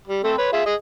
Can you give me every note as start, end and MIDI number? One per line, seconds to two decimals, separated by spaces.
0.08 0.24 55
0.24 0.33 57
0.24 0.33 60
0.24 0.33 69
0.38 0.49 71
0.38 0.49 73
0.53 0.62 65
0.53 0.62 68
0.53 0.62 76
0.66 0.74 68
0.66 0.74 75